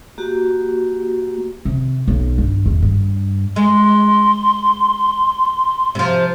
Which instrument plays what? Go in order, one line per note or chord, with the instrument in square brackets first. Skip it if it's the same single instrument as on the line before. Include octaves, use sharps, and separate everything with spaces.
[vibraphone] A#3 F#4 G4
[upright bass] C3
B1
G2
E2
G2
[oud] G#3 [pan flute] C6
[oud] C3 F3